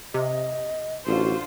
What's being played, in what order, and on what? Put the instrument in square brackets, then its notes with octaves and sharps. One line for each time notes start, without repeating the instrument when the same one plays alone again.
[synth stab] C3 [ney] D#5
[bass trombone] A1 [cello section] D3 F4 C5 [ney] F#4